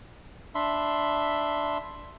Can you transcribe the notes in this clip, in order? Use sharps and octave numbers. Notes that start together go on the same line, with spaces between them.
D4 E5 B5 C6